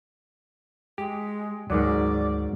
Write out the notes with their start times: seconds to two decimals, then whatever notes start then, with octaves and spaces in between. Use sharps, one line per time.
0.98 G#3 G4
1.70 D2 G#2 D#3 F#3 D5